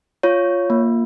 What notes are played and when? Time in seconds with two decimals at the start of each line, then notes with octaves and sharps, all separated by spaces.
0.23 F4 C#5
0.70 A#3